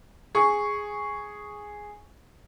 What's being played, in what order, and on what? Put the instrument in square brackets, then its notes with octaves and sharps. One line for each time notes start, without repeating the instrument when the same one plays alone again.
[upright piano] G#4 C#6